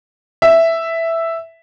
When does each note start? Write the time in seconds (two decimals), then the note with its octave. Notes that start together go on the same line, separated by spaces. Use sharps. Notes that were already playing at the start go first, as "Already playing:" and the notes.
0.42 E5